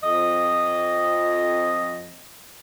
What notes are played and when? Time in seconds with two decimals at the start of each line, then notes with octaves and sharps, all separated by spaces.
0.02 F2 D#5